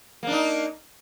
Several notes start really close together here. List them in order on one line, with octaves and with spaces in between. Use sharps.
A#3 D4 D#4